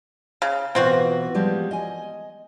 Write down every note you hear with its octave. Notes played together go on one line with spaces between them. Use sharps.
C#3
B2 E3 C4 F4 F#4
F3 G3 G#3
D#5 G#5